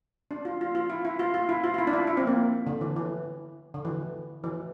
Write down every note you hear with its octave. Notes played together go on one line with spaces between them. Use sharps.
D4
F4
F4
F4
E4
E4
F4
F4
E4
F4
F4
E4
D4
E4
E4
C4
A#3
D3
E3
E3
D3
E3
E3